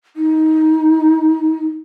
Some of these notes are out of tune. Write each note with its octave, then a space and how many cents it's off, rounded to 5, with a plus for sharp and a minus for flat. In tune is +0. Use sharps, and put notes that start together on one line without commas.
D#4 +20